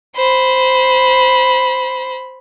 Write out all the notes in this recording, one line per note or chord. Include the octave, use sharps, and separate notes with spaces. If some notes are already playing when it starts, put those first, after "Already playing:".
C5 B5